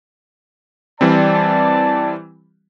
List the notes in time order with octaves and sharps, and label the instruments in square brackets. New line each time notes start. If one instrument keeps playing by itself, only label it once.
[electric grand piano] E3 G3 C4 [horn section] D5 A5